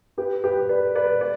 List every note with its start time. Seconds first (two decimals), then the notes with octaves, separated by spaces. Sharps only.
0.18 G4 B4
0.44 G4 B4
0.69 B4 D5
0.95 B4 D5
1.21 D5